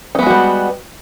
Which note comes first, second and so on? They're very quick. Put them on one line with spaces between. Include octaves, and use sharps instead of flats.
D#4 B3 G#3 F#4 G3